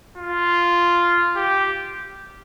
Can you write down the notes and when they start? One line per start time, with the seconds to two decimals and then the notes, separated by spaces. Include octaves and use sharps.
0.17 F4
1.36 G4